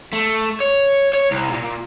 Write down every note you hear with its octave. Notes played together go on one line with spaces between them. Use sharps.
A3
C#5
C#5
C2
A#2